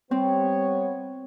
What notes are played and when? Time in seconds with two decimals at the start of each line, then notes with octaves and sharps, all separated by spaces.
0.11 G3 B3 C4 C#5